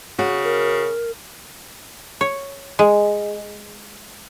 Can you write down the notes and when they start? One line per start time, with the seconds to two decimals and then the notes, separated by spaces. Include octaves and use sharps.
0.19 C#3 F#4
0.44 A#4
2.21 C#5
2.79 G#3